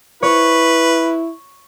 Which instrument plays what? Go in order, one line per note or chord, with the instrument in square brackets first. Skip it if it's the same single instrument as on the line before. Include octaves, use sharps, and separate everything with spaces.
[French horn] E4 [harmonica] B4 [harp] C#5